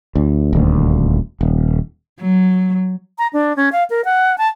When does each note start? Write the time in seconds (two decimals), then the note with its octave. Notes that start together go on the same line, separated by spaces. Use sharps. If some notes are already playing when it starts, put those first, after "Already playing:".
0.15 D2
0.53 D#1 D2
1.41 D#1
2.21 F#3
3.18 A#5
3.33 D4
3.56 C#4
3.72 F5
3.90 A#4
4.05 F#5
4.38 A5